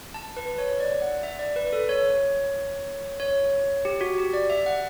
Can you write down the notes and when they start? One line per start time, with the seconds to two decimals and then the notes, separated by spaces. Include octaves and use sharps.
0.14 A5
0.37 B4
0.58 C#5
0.80 D5
1.02 F#5
1.23 E5
1.39 D5
1.56 B4
1.72 A4
1.89 C#5
3.20 C#5
3.85 G4
4.01 F#4
4.18 G4
4.34 D5
4.50 E5
4.66 F#5